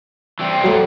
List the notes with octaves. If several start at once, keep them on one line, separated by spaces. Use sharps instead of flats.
E3 G3 C4
F#3 A3